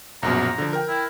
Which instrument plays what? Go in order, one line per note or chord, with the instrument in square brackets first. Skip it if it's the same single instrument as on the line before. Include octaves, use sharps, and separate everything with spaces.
[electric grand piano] A#1 F#2 B2 [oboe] A#5
[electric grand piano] D3 F3
A#4 G5
[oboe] E4